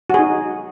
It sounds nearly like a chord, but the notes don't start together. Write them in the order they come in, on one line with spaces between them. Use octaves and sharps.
F#4 G#4 D#4